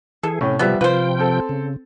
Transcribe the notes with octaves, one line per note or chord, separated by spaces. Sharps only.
E3 G#4 A4
A2 C3 C#4
F3 G3 B3 E5
C3 F3 F4 B4 C5 G5
C4 A4
C#3